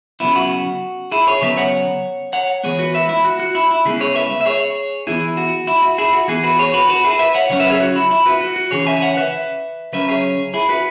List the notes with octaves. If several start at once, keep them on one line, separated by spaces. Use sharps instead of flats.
C#3 F#3 B3 E4
F#4
E4 G#4
G#4 C#5
C#3 F#3 B3 B4 E5
C#5 F#5
C#5 F#5
E3 G#3 B3 G#4 C#5
F#4 B4
B4 E5
E4
F#4
F#4
E4
E4
C#3 G#3 B3 E4 G#4
G#4 C#5
B4 E5
E5
G#4 C#5
E3 B3 E4 G#4
F#4
E4
F#4
E4 G#4
F#4
E3 B3 E4 G#4
F#4 B4
G#4 C#5
F#4 B4
F#4 B4
E4 G#4
B4 E5
C#5 F#5
C#3 F#3 C#4 C#5 F#5
B4 E5
G#4 C#5
F#4
E4
E4
F#4 B4
F#4
F#4
C#3 E3 C#4 G#4 C#5
E5 G#5
C#5 F#5
B4 E5
C#3 F#3 C#4 B4 E5
G#4 C#5
E4 G#4
F#4 B4